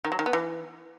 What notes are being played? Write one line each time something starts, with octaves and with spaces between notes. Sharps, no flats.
D#3
F#3
D#3
B3
E3